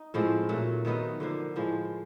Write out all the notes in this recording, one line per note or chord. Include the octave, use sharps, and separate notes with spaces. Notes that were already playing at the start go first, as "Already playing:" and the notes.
Already playing: D#4
A2 F3 G#3 C4
A#2 F#3 A3
D#3 F#3 B3 D#4
D3 F3 A#3
A2 F3 G#3